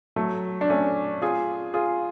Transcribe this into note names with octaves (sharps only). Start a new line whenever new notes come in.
F#3 A3
D4
A3 C#4
F4 G#4
F4 G#4